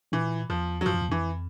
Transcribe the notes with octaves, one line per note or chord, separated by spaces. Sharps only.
A#2 E3
E2 F3
F#3
F#2 F3
F2
E2
F2 E3